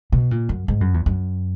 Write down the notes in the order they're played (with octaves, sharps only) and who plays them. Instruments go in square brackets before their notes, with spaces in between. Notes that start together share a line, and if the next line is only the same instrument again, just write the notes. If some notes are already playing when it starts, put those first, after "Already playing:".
[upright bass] B2
A#2
F#2
G#2
F#2
E2
F#2